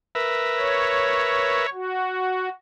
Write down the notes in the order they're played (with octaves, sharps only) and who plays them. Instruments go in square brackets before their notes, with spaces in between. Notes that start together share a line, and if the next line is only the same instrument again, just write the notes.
[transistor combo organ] A#4 B4 E5
[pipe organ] C#5
F#4